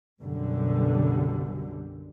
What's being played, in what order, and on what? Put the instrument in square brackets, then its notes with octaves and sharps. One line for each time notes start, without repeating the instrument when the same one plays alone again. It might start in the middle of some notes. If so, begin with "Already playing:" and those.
[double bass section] B1 F#2 D3 G3